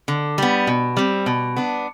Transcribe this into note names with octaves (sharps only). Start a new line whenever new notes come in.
D3
G3 B3
B2
G3 C4
B2
B3 D4